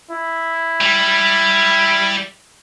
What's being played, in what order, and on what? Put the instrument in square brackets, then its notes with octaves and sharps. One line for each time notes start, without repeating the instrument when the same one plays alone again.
[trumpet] E4
[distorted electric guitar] G3